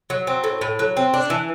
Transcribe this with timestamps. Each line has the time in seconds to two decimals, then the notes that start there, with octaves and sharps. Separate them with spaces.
0.10 F#3
0.27 C4
0.44 A2
0.61 A2
0.79 F#3
0.97 C4
1.14 D4
1.30 E3